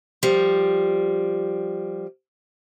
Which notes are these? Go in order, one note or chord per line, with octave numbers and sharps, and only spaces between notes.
F3 G3